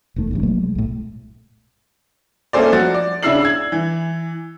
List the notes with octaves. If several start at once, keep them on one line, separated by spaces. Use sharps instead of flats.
E1 D#2 D#3 A3
G#1 E2 G2
B2 F#3 A3 A#3
G#3
B1 A2
A3 A#3 C#4 A4 C5 D5
F3 F#4 A6
D5
C#3 D4 E4 E6 C7 F#7
E6 G#6
E3